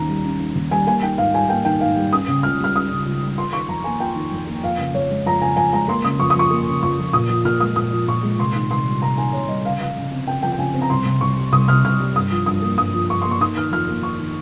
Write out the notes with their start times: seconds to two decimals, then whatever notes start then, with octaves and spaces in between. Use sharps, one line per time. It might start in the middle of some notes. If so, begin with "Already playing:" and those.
Already playing: D#2 D#3 C#4 A#5
0.09 G3
0.25 C#4
0.40 D#3
0.55 D#2
0.71 G3 G#5
0.87 A#3 G#5
1.03 D#3 G5
1.18 G#2 F5
1.34 G3 G#5
1.49 A#3 G5
1.65 D#3 G5
1.81 G#2 F5
1.96 G3
2.12 C#4 D#6
2.28 C#3
2.43 C#2 F6
2.60 G3 F6
2.75 C#4 D#6
2.91 C#3
3.06 C#2
3.21 G3
3.37 F4 C6
3.53 D#3 C#6
3.68 F2 A#5
3.84 A#3 G#5
4.00 F4 G5
4.16 D#3
4.32 F2
4.47 A#3
4.63 F2 F5
4.78 C#3
4.94 F2 C#5
5.10 G#3
5.26 F2 A#5
5.42 C#3 G#5
5.57 F2 G#5
5.73 G#3 A#5
5.88 A#3 C6
6.04 C#3 D#6
6.20 F2 C#6
6.30 D#6
6.36 F3 C#6
6.51 A#3
6.67 C#3
6.82 F2 C#6
6.99 F3
7.13 A#2 D#6
7.30 F3
7.45 A#2 F6
7.60 G#3 D#6
7.76 A#2 D#6
7.93 F3
8.07 A#2 C#6
8.23 G#3
8.39 C3 C6
8.56 D#3
8.70 C3 C6
8.86 G3
9.02 C3 A#5
9.17 D#3 G#5
9.33 C3 C#5
9.48 G3 D#5
9.65 C#3 F5
9.80 F3 F5
9.97 C#3
10.11 C4
10.27 C#3 G5
10.43 F3 G5
10.53 G5
10.59 C#3 G#5
10.74 C4
10.81 A#5
10.90 C2 C6
11.06 C3
11.21 C2 C#6
11.37 G3
11.52 C2 D#6
11.68 C3 F6
11.84 C2 F6
12.00 G3
12.15 G2 D#6
12.31 F3
12.46 G2 D#6
12.62 A#3
12.78 G2 D#6
12.94 F3
13.10 G2 C#6
13.22 A#3 C6
13.31 C#6
13.40 D#4 D#6
13.57 D#3 F6
13.72 F2 F6
13.89 A#3
14.03 D#4 C#6
14.19 D#3